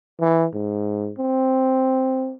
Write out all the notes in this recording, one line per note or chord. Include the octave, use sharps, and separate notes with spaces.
E3
G#2
C4